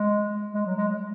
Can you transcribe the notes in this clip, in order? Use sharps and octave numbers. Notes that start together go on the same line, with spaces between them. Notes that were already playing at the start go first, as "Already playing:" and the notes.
Already playing: G#3
G#3
F#3
G#3
G#3